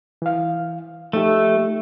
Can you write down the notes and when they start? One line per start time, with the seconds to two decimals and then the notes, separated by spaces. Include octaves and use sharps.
0.22 E3 F5
1.13 F3 A3 D#4 G4